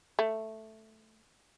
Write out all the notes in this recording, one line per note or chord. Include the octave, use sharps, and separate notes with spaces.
A3